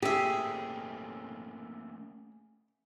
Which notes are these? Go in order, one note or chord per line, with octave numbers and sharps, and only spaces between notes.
A3 A#3 C#4 G4 G#4 E5